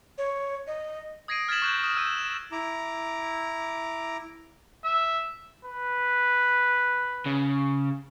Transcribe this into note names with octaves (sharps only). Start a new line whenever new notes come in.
C#5
D#5
D#6 G#6 A#6 C7 D7 D#7
F6 G#6 A6 B6 E7 F#7
C#6 F#6 G6 F#7
D#6
E6 F6 G6 D#7
E7
E4 A#5 D6
E5
B4
C#3